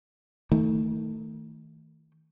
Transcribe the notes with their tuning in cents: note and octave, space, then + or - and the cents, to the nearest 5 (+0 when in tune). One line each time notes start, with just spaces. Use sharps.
D#3 +30 A3 +15